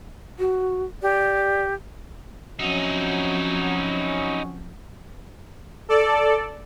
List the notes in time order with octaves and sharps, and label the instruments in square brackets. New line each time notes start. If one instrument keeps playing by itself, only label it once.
[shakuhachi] F#4
[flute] G4 [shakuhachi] D5
[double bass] F3 C4 [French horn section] F#3 C#4 [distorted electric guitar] D#4 E4
[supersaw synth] A4 D5